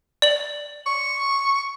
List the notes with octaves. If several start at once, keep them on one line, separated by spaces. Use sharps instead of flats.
D5 F#7
C#6